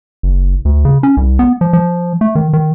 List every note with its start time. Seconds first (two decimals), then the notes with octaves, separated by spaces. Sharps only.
0.23 F#1
0.65 D2
0.85 C#3
1.03 C#4
1.17 C2
1.39 B3
1.61 F3
1.73 F3
2.21 A3
2.35 D#3
2.53 D#3